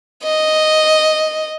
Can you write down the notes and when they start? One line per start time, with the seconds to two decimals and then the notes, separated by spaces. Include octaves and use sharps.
0.24 D#5